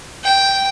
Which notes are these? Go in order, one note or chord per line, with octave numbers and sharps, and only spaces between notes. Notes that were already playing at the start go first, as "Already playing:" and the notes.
G5